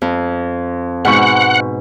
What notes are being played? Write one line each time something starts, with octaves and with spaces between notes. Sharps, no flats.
F2
G#2 B2 F#5 C#6